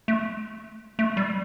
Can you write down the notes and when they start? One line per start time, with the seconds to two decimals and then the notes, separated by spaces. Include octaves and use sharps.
0.08 A3
0.99 A3
1.17 G3